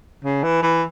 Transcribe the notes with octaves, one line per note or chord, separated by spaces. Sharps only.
C#3
E3
E3